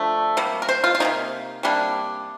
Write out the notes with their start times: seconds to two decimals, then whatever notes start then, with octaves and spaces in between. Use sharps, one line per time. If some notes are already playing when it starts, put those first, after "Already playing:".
Already playing: D3 F3 A3
0.37 C3 G3 A#3
0.62 A#4
0.69 C5
0.84 F4
0.95 F4
1.00 F3 A#3 D#4
1.05 C3
1.63 C3 G3 A#3 D4